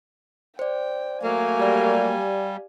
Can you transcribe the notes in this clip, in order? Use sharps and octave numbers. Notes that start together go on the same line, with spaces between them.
C5 D5 G5
F#3 A3 A#3 F5 G#5
G3 G4 D5